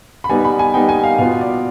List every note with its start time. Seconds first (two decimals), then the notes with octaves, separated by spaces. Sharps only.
0.24 B5
0.29 G3 B3 D#4 G#5
0.45 B5
0.59 G#5
0.74 G3 B3 D#4 G5
0.89 G#5
1.04 F5
1.18 B2 B3 F4 F5
1.41 D5